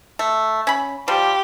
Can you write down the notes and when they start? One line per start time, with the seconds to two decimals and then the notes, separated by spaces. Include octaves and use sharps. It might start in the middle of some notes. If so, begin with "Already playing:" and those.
0.19 A3
0.67 C#4 B5
1.08 F3 G3 G4